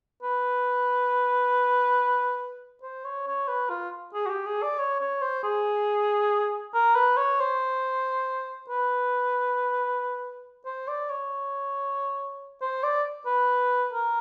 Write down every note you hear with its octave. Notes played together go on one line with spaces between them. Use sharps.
B4
C5
C#5
C#5
B4
F4
G#4
F#4
G4
G#4
D5
C#5
C#5
C5
G#4
A#4
B4
C#5
C5
B4
C5
D5
C#5
C5
D5
B4
A#4